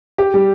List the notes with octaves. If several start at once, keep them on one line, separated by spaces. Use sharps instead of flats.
G4
G3